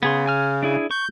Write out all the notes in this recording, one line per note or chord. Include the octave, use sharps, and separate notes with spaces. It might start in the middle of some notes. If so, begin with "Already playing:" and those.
C#3 B3 G#4 C6
G#5 F6
D4 E4 G#4
C#6 G6